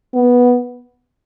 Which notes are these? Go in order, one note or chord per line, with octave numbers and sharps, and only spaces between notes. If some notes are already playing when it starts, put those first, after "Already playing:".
B3